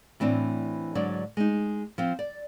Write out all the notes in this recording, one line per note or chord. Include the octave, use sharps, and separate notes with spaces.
A2 E3 C4 D4
G#2 D3 F#3 D4 D5
G#3 D#4
F3 C4
D5